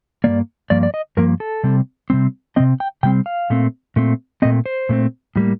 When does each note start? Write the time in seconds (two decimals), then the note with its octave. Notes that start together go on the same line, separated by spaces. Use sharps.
0.24 G2 F3 A#3 D5
0.70 G2 F3 A#3 D5
0.83 D5
0.94 D#5
1.17 G2 F3 A#3 A#4
1.40 A4
1.64 C3 G3 C4
2.10 C3 G3 C4
2.56 C3 G3 C4 D#5
2.80 G5
3.03 C3 G3 C4 G5
3.26 F5
3.50 A#2 A3 C4
3.96 A#2 A3 C4
4.42 A#2 A3 C4 D#5
4.66 C5
4.89 A#2 A3 C4
5.36 A2 G3 A#3